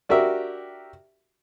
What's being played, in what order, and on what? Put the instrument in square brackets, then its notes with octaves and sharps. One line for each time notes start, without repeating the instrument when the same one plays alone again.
[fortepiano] D4 F#4 G4 A#4 E5